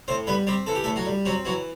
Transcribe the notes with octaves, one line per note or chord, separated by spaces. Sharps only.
A2 C4 C5
G3 B3 B4
G3 C4 G4
E3 A4
G4
A2 A3 A4
F#3 F#4
G3
F#3 C4 F#4
E3 F#3 F#4